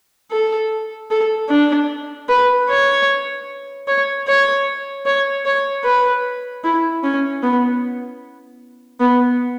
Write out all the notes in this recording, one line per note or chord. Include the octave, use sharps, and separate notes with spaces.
A4
A4
D4
B4
C#5
C#5
C#5
C#5
C#5
B4
E4
C#4
B3
B3